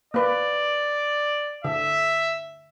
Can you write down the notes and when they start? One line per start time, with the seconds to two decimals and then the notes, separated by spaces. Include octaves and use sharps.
0.14 A#3 B4 D5
1.65 D3 E5